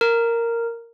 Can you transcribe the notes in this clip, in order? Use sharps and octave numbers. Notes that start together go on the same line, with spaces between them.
A#4